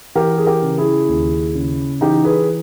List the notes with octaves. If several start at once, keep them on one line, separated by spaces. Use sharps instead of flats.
E3 G4 A#4
G#4
G4 A#4
C#3
E4 G#4
D#2
C#3
E3 D#4 G4
G#4 B4